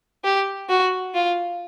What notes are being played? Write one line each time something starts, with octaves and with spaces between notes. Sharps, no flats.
G4
F#4
F4